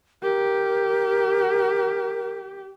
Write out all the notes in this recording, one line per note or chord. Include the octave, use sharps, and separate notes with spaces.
G4 A#4